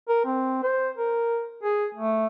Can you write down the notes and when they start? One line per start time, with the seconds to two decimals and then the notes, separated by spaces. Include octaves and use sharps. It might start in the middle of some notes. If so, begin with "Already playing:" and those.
0.09 A#4
0.26 C4
0.63 C5
0.98 A#4
1.63 G#4
1.95 A3